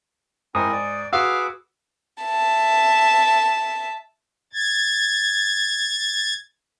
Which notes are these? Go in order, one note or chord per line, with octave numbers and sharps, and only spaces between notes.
G#2 C4 E4 A#4 D#6
D5
F#4 G#4 B4 F5 D6 E6
E5 A5
G#6 A6